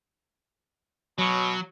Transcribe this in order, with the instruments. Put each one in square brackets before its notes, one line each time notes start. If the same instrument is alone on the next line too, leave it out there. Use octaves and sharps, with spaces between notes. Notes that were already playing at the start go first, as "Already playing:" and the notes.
[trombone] B2 [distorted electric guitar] F#3